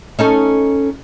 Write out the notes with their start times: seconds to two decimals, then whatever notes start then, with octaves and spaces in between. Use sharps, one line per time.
0.19 C#4 D#4 A4